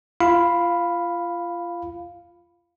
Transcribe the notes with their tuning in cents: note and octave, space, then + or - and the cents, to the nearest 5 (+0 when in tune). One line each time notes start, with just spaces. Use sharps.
F4 -25 F5 +0 B5 +0